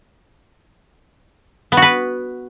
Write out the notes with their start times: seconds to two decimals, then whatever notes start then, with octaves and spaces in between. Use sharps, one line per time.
1.72 B3
1.77 F#4
1.82 B4